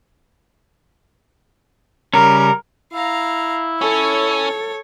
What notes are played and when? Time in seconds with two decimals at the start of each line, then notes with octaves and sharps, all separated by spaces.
2.13 C#3 G3 C#4 A#4
2.93 E4 F5 A#5
3.81 C#4 A4 C#5